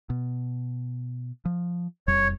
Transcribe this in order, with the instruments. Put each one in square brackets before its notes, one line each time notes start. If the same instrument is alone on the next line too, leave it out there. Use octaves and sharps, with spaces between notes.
[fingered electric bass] B2
F3
[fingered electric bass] E1 F2 G3 [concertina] C#5